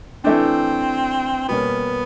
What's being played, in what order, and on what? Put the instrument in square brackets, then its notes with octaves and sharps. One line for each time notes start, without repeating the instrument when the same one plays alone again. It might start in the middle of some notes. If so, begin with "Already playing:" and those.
[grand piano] E3 A3 D4 [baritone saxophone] C4
[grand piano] B2 G3 A#3 C#4 [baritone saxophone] B3